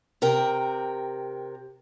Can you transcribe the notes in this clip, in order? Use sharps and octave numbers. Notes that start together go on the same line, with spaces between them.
C3 A#4 G5